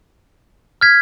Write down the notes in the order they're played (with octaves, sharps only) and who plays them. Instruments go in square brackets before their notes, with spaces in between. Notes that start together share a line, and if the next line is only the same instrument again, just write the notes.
[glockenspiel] F6 G#6 B6